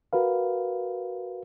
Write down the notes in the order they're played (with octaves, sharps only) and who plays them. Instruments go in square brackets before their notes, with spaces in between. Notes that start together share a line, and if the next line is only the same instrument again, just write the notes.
[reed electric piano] F#4 A#4 B4 F5